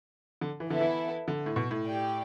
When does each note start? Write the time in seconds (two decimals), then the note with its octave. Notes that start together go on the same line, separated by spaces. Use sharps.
0.41 D3
0.60 E3
0.69 D3 B3 E4 A4
0.80 E3
1.28 D3
1.46 A2
1.56 B2
1.71 A2
1.85 G4 D5 G5